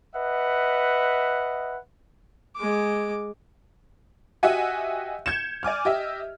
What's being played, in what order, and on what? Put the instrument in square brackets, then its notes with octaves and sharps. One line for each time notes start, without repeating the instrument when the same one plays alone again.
[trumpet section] B4 D#5 E5 F#5
[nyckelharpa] G#3 D6
[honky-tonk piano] F#4 G4 D#5 E5 F#5 G#5
G6 G#6 C#7 E7
D5 G#5 D6 F6
G4 D#5 E5